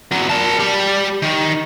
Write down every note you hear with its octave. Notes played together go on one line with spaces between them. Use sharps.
E2 F#3
A#4 A5
G3 G4
D#3